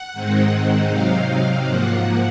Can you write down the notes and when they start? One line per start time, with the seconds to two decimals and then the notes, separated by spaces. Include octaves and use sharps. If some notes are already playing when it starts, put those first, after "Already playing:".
Already playing: F#5
0.13 G#2 D#3 G#3 C4 D#4
0.88 C3 F#3 C4 D#4 F5
1.64 G#2 F3 A#3 F#5